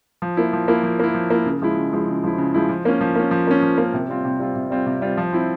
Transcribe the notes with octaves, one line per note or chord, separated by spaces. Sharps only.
F3
A#3 E4
F3
A#3 E4
F3
A#3 E4
F3
A#3 E4
C#3
F3 G#3 E4
C#3
F3 G#3 E4
C#3
F3 G#3 E4
C#3
F3 G#3 E4
F3
A#3 C#4
F3
A#3 C#4
F3
A#3 C#4
F3
A#3 C#4
C3
G3 C4 F4
C3
G3 C4 F4
C3
G3 C4 F4
C3
G3 C4 F4
F3
C4 E4